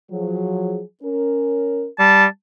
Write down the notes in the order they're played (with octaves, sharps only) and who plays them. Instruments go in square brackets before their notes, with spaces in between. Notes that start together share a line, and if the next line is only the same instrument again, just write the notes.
[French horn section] F3 F#3 G#4
C#4 A#4
[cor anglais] G3 [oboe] A5